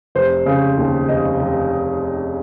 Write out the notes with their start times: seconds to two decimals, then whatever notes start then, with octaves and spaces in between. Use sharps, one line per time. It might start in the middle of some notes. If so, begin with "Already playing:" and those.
0.15 F1 C5
0.46 C#3
0.78 D#2
1.09 F1 D#5
1.40 F1